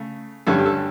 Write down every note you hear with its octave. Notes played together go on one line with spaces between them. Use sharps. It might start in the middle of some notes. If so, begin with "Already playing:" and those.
Already playing: C#3 A3
G2 D3 G3 C#4 A4
G4
A4